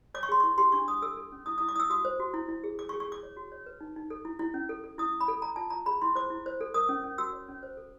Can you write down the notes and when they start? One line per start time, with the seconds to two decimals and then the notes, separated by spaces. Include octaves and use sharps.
0.14 C#5 D6
0.23 C#6
0.29 G#4 C6
0.40 C#6
0.43 E4
0.58 G4 C6
0.72 D4 C#6
0.88 D4 D#6
1.02 A4 E6
1.17 A4
1.32 C#4
1.46 E4 D#6
1.58 D#6
1.61 E4
1.68 D6
1.76 E4 D#6 E6
1.90 F#4 D#6
2.05 C5
2.19 F#4
2.34 E4
2.48 E4
2.64 G#4
2.79 G#4 D6
2.89 C#6
2.94 G#4
3.00 C#6
3.08 G#4 D6
3.23 C#5
3.37 F#4
3.52 C#5
3.66 B4
3.81 D#4
3.96 D#4
4.10 A4
4.25 E4
4.39 E4
4.54 C#4
4.69 A4
4.84 A4
4.98 E4 D#6
5.13 E4
5.20 B5
5.28 A4
5.42 A4 A#5
5.56 F4 A5
5.70 F4 A#5
5.86 G#4 B5
6.01 E4 C6
6.15 C5 D6
6.30 E4
6.46 C5
6.61 A4
6.74 A#4 D#6
6.89 C#4
7.04 C#4
7.18 F#4 E6
7.33 C#5
7.48 C#4
7.63 C5
7.77 A4